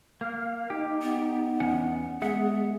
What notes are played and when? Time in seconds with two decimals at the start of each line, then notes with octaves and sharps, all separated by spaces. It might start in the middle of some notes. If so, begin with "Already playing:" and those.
0.21 A#3 F5
0.70 D#4 G4
1.02 B3
1.60 E2 C#4 F#5
2.22 G#3 B3 G#4 E5 F#5